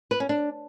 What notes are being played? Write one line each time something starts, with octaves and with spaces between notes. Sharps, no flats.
B4
C#4
D4